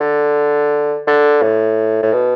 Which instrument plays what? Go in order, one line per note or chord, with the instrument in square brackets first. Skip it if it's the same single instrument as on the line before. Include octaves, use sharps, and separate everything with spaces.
[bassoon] D3
D3
A2
A2
B2